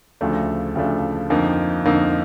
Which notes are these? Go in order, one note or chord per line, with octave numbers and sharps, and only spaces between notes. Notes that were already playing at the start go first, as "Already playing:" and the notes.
D2 C#3 F3 A3 D4
D2 C#3 F3 A3 D4
F2 D3 F3 A#3 D#4
F2 D3 F3 A#3 D#4